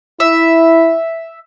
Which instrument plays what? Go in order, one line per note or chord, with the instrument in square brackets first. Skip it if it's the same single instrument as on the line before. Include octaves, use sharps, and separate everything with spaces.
[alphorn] E4 [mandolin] E5